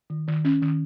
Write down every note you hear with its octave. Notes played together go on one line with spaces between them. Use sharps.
D#3
D#3
C#4
D#3